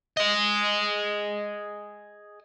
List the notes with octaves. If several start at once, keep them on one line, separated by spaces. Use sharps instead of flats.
G#4 D#5